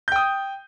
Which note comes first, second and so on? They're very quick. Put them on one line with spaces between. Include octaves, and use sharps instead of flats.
G6 G5 D#6